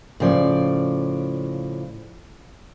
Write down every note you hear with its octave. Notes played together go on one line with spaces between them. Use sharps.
A2 C#3 F3 D5